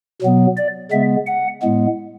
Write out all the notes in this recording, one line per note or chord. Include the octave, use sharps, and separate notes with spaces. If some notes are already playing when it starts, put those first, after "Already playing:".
B2 F#3 B3
D5
C#3 G#3 B3 E5
F#5
A2 G#3 B3